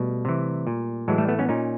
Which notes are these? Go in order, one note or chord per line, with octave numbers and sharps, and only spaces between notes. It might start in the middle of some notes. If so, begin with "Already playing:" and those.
Already playing: B2 G3 A3
C3 E3
A#2
A2 E3 F#3 G#3
G3 A3
A3 B3
B3 C#4
A#2 C#4 D#4